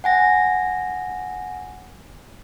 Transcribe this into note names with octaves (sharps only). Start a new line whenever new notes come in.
F#5 G#5 A#6